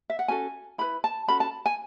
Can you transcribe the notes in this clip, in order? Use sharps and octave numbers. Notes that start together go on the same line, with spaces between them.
E5
F#5
C#4 F#4 A4 G#5
E4 B4 B5
A5
C#4 F#4 A4 B5
A5
G#5